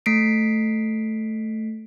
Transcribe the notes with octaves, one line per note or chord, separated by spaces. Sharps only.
A3 B6 C7 D7